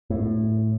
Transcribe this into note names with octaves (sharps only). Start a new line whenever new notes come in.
A2